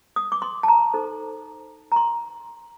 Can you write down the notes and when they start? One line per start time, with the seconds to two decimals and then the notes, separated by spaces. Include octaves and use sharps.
0.16 D#6
0.32 D6
0.42 C6
0.63 A5
0.68 A#5
0.94 D#4 A4 C5
1.92 A#5
1.96 C6